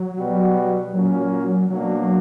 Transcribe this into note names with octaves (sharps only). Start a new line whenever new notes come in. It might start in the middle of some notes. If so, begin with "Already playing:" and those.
Already playing: F#3
B2 G3 B3 F#4
A#2 F#3 A#3 C#4
F#3
B2 F#3 A#3 D4 F#4